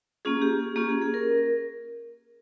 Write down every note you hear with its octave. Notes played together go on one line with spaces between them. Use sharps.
A#3 C#4 F4 G#4
G4
G#4
A#3 C#4 F4 G4
G#4
G#4
A#4